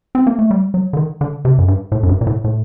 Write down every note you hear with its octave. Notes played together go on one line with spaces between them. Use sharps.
C4
A#3
A3
G3
F#3
D3
D#3
D3
C3
F#2
G2
A2
F#2
G2
A#2
A2
A2